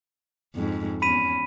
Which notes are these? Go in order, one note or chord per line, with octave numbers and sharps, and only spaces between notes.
F2 G#2
E2 C#4 B5 B6 D#7